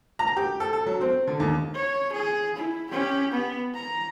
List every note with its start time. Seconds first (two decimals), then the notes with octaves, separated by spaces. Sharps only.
0.19 A#5
0.36 G4
0.60 A4
0.73 A4
0.86 F#3
1.01 C4
1.27 D3
1.40 D#2
1.75 C#5
2.13 G#4
2.56 E4
2.91 C#4 G4
3.32 B3
3.75 A#5